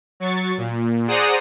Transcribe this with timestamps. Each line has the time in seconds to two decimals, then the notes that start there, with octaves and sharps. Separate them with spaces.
0.20 F#3 C#6 A6
0.58 A#2
1.07 G#4 C5 D5 F#5 A#5 D#6